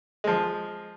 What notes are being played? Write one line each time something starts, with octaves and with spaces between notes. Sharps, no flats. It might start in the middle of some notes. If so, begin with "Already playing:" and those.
F3 G#3